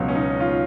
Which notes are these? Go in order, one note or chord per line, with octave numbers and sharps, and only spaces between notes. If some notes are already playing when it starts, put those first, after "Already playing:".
Already playing: C#2 B2 F#3
C#4
D#4
F4